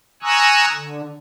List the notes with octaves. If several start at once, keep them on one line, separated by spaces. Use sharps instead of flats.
G#5 A#5 C#6 D#6 E6 F#6
D3